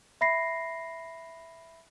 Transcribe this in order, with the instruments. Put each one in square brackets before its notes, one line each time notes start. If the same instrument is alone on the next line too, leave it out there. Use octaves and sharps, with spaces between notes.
[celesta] E5 B5 A#6 C7